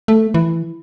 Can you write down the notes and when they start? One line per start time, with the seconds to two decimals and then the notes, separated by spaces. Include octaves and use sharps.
0.08 A3
0.34 E3